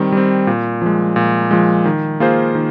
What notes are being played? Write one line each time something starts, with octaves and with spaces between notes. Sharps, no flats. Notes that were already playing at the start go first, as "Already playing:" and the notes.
Already playing: D#3 G3 C4
G3 C4
A#2
F3 G#3
A#2
F3 G#3
D#3
A#3 F4 G#4 C5
D#3